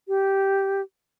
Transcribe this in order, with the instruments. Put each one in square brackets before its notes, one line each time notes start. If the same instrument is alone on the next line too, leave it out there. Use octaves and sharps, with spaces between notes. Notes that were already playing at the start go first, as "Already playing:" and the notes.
[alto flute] G4